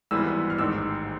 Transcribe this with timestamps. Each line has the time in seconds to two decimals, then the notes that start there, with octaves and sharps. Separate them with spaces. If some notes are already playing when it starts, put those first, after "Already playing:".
0.11 G#1 G#2 E3 G3 B3 E6
0.50 F6
0.58 A1 G#2 D#3 E6